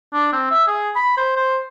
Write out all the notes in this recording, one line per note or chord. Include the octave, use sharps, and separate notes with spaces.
D4
C4
E5
G#4
B5
C5
C5